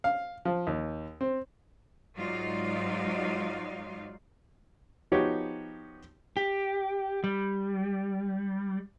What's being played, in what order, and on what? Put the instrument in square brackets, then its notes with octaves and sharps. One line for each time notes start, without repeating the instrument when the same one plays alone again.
[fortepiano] F5
F3
D#2
C4
[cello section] G#2 F#3 D#4 F4 D5 F5
[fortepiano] F3 B3 D#4 F#4 G4 C#5
[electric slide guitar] G4
G3